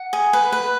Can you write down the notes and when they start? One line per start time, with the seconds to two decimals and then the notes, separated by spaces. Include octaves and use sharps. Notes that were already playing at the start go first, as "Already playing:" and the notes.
Already playing: F#5
0.13 G#4
0.33 B4
0.52 B4